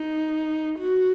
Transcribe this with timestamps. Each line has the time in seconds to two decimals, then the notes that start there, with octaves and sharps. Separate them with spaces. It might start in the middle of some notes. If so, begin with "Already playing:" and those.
Already playing: D#4
0.79 F#4